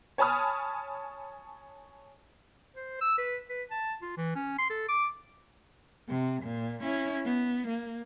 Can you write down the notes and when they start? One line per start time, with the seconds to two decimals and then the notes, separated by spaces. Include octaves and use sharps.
0.18 C#5 G#5 A5 B5 D#6 F6
2.76 C5
3.01 E6
3.18 B4
3.50 B4
3.71 A5
4.02 F4
4.18 E3
4.36 C#4
4.59 C6
4.70 A4
4.89 D6
6.09 C3
6.43 A#2
6.81 C#4 E4
7.25 B3
7.68 A#3